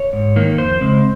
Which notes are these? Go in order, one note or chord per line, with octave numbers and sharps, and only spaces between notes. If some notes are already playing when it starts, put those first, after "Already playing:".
Already playing: C#5
G#2
D#3 A#3
F2 C5
C#3 G#3 C4